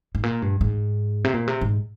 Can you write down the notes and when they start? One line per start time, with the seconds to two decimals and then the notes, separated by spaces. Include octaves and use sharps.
0.15 G#2
0.23 A#2
0.42 G2
0.61 G#2
1.24 C3
1.34 A#2
1.47 C3
1.61 G#2